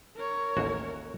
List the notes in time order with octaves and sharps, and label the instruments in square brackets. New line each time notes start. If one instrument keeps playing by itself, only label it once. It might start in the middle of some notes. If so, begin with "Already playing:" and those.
[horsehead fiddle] A#4 C#5
[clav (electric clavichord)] A1 D#2 F#4